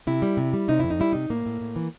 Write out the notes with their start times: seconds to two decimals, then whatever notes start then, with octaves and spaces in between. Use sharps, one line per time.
0.07 C3 E4
0.22 G3
0.37 C3
0.54 G3
0.68 C3 D#4
0.80 F2 E4
0.90 D#4
1.00 G3 E4
1.13 C3 D#4
1.30 A2 A#3
1.46 A2
1.61 A2
1.76 E3